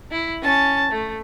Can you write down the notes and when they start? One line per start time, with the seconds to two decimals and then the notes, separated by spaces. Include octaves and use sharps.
0.11 E4
0.42 C#4 A5
0.91 A3